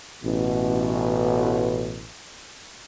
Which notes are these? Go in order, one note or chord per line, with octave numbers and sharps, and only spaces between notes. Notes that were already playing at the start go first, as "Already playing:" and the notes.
A1 B2